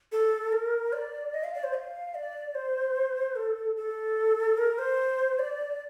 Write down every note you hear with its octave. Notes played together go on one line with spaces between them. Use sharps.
A4
A#4
D5
D#5
F5
D5
C5
F5
D5
C5
A4
A4
A#4
C5
D5